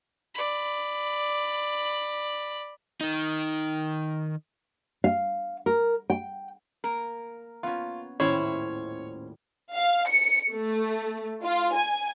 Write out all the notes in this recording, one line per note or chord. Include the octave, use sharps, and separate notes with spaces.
D5 B5
D#3 D#4
F5
A#4
G5
A#3 A#4
B3 C#4 F4
D#1 A2 C#4 E4 C5 C#5 E5
F5
C#7
A3
F4
G#5